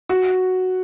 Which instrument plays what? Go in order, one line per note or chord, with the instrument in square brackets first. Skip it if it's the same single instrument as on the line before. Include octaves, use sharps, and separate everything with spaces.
[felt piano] F#4